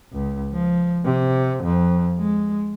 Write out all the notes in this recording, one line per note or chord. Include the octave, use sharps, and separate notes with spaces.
C#2
F3
C3
F2
G#3